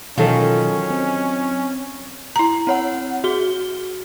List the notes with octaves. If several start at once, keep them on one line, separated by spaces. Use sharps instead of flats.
B2 D#3 E3 F#3 C#4 F4 A4
C4
E4 A#5
C4 C#5 F#5
F#4 G#4 G7